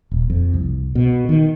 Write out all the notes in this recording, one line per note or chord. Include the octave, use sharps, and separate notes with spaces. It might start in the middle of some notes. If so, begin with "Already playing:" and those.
D#1
F2
C2
B2
D#3